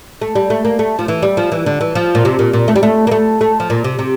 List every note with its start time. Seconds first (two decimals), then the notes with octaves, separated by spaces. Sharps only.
0.21 A3
0.35 G3
0.50 A3
0.65 A#3
0.79 A3
0.99 F3
1.08 E3
1.23 G3
1.37 F3
1.52 E3
1.66 D3
1.81 E3
1.95 F3
2.15 A#2
2.25 C3
2.39 A#2
2.53 A#2
2.68 A3
2.76 G3
2.83 A3
3.07 A#3
3.11 A3
3.41 A3
3.60 F3
3.70 A#2
3.84 C3
3.99 C3